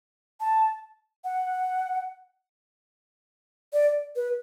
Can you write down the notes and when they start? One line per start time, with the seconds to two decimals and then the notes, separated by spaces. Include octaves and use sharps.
0.40 A5
1.24 F#5
3.73 D5
4.16 B4